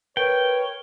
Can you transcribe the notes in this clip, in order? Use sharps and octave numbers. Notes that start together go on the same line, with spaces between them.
A#4 B4 C#5 G5